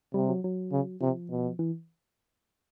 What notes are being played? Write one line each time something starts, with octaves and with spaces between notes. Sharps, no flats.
C3 G3
F#3
F#3
C#3
C3 F3
B2
E3